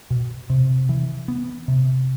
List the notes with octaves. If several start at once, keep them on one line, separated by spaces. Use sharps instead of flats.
B2
C3
E3
B3
C3